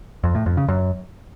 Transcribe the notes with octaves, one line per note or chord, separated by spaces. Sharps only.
F2
A2
F2
C#3
F#2